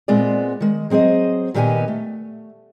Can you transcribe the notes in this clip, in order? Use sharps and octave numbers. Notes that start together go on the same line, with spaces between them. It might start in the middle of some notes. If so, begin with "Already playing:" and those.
A#2 G#3 B3 C4 D5
D#3 G#3
F#3 C4 G#4 C5 D#5
A#2 D#3 B3 G4 B4 G#5
A3